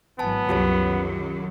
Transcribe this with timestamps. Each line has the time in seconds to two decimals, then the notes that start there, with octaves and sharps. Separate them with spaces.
0.19 G#1 E3 F#3 B3 G#5 A5
0.49 C2 F#2 F#3 F4 G4 C#5
0.80 D#3